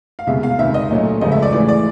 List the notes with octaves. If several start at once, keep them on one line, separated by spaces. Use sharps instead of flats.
F5
C2 B2 G#3 E5
F5
C#2 C3 D#3 E5
D#5
A#2 F#3 A3
C#2 C#3 F3 A3 D#5
E5
D5
A2 E3 G#3 D5
D5